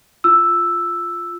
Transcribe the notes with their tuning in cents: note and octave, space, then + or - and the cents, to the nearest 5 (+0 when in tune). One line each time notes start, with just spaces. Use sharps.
F4 +0 E6 +0